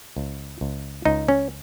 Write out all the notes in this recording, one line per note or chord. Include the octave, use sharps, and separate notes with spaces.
C#2
C#2
C#2 D#4
C#4